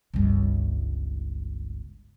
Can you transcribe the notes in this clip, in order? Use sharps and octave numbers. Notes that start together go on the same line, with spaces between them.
G1 C#2